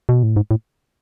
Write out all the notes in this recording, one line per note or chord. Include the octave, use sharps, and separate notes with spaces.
B2
A2
G#2
A2